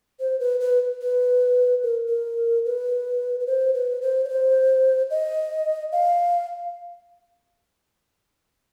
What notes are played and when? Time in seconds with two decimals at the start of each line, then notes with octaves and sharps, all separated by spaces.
0.20 C5
0.40 B4
0.60 B4
1.01 B4
1.83 A#4
2.08 A#4
2.65 B4
3.40 B4
3.47 C5
3.74 B4
4.02 C5
4.24 C#5
4.29 C5
5.10 D#5
5.92 F5